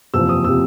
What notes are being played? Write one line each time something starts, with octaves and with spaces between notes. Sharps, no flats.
F#1 E2 C3 F3 E6
D#6
C3 F3 E6